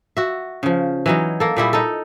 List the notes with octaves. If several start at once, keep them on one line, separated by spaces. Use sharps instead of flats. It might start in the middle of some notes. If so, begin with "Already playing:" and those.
F#4 E5
C#3 F3
E3 F#3 D#4
A#3 A4
A#2 G3 E4 G#4
D#4 A4